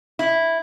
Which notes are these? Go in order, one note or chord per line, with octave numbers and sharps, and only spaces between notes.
E4